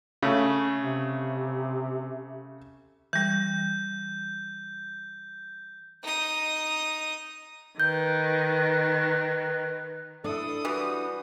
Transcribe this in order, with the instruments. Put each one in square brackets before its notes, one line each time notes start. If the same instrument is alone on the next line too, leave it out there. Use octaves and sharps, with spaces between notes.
[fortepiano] C#3 A3
[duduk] C3
[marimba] E3 G3 [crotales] G6
[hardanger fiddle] D#4 D#6
[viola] D#3 [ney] B4 [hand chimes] G6
[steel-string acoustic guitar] D4 E4 [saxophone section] A4 [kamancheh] D#6
[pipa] E3 [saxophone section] G3 F#4